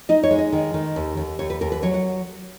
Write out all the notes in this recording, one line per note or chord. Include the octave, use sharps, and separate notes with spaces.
D#4 D#5
C#5
G#3
D#5
D#3
D#3
D#2
D#2
D#2 C#5
B4
D#2 A#4
B4
F#3 C#5
F#5